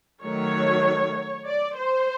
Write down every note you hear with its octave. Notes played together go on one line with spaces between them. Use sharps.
D#3 F#3 A3 C#5
D5
C5